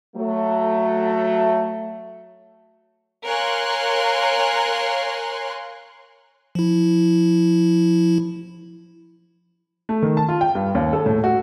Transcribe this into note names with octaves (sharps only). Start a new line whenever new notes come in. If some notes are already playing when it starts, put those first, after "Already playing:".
F#3 A3
A#4 C#5 F5 G#5 C6 F#6
F3 E4
A3
D#3
A5
F4
G5
G2
D#2
A4
A2
F#4